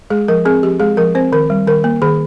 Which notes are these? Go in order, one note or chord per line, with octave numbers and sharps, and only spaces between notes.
G#3 G#4
F3 A#4
C4 G#4
F3 G4
G#3 G#4
F3 A#4
C4 C5
D#3 A#4
G3
D#3 A#4
A#3
D#3 G#4